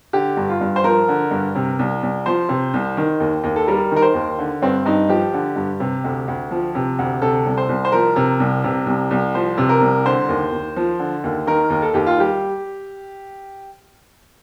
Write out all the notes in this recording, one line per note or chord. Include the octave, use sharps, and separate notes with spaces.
D3 G4
G2
F4
G2
C5
F3 A#4
D3
G2
C3
C2
C2
F3 C5
C3
C2
D#3
D#2
D#2
A4
G3 A#4
D#3
A#4
C5
D#2
D3
G2 C4
G2 D#4
F3 G4
D3
G2
C3
D2
D2
F3
C3
D2
C3 A4
C2
C5
C2
C5
F3 A#4
C3
C2
C3
C2
C2
F3 C5
C3
A#4
C2
D3 C5
D#2
D#2
F3
D3
D#2
D#3 A#4
D#2
A4
D#2 G4
F4
G3 G4